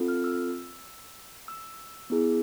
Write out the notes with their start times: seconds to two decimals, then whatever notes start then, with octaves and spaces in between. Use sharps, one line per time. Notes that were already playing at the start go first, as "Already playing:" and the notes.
Already playing: C4 F4 A4
0.08 F6
0.24 E6
1.48 E6
2.10 B3 E4 G#4